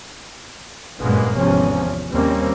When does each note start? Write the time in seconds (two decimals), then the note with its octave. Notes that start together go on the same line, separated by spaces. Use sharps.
1.01 G1 F#2 A#2 G#3 A#3 B3
1.35 G#1 E2 C3 F3 C#4
2.10 D#2 G3 A#3 C4 C#4